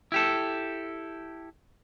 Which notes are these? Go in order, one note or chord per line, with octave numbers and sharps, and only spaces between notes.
E4 G4 A4